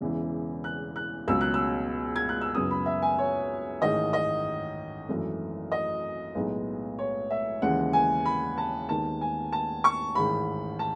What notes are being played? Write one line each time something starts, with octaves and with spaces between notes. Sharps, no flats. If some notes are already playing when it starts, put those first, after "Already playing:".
E1 E2 C#3 E3
F#6
F#6
C#2 B2 F#3 C#4 E6
F#6
E6
G#6
F#6
E6
F#1 F#2 C#3 G#3 B3 D#6
B5
E5
G#5
C#5
A1 G#2 D#3 D#5
D#5
G#1 F#2 E3 A3
D#5
B1 A2 G#3 B3 D#4
C#5
E5
D#2 C#3 E3 G#3 F#5
G#5
B5
A5
D#2 D#3 G#3 B3 D#4 A5
G#5
A5
C#6
A1 G#2 D#3 B5
A5